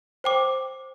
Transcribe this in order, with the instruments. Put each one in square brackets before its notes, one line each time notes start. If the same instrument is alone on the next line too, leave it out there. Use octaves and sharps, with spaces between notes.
[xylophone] C5 G5 D6